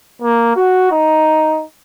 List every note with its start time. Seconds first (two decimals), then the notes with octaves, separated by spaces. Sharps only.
0.22 A#3
0.56 F#4
0.92 D#4